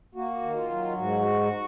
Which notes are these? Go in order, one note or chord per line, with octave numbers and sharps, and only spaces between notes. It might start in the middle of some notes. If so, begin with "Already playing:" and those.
A#3 F#4
D#3
F4
F#3
G#2 F#4